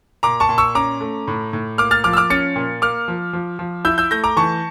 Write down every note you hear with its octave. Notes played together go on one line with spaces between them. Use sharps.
A#2 A#5 D6
A5 C#6
A#2
C#6 E6
C#4 A#5 D6
A3
A2
A2
A#3 D6 F6
F6 A6
F3 D6 F6
E6
D6 F6
C#4 A6 C#7
A#2
A#3 D6 F6
F3
F3
F3
E4 E6 G6
E6 G6
A3 G6 A#6
A#5 D6
E3 A5 C#6